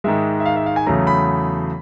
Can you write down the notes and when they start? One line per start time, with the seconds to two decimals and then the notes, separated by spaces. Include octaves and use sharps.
0.04 G#2 D#3 G#3 E5
0.40 E5
0.45 F5
0.56 E5
0.66 F5
0.76 G#5
0.86 E2 C#3 F#3 A3 A#5
1.07 B5